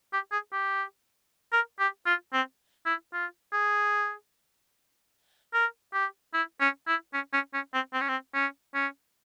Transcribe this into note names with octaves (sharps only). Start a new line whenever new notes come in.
G4
G#4
G4
A#4
G4
F4
C4
E4
F4
G#4
A#4
G4
E4
C#4
E4
C#4
C#4
C#4
C4
C4
C#4
C4
C#4
C#4